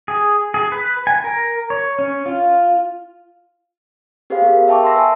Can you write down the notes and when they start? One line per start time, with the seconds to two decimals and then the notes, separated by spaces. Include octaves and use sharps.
0.08 G#4
0.54 G#4
0.72 B4
1.07 G#5
1.24 A#4
1.70 C#5
1.99 C#4
2.26 F4
4.30 C#4 G4 G#4 B4 C5 F5
4.42 B3 A#4
4.68 E5 G5 A5 C#6 D6
4.84 C6 E6 A#6
4.96 B4 G#5 A5